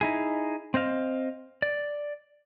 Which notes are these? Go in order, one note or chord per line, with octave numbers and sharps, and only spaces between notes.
D#4 E4 G#4
C4 C5 D#5 F5
D5